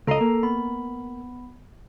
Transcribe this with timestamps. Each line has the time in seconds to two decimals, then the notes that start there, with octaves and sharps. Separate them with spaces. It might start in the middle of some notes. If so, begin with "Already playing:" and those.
0.07 C#2 A4 D#5 A#5 C7
0.21 A#3
0.43 B3 B5